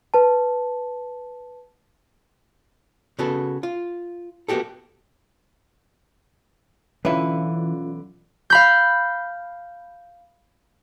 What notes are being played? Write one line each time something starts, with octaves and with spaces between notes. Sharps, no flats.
B4 A5
C#3 B3 F#4 A4
F4
A#3 B3 C#4 F#4 G4 A4
B1 E2 D3 E3 C#4 F4 B4 E5
F5 B5 G6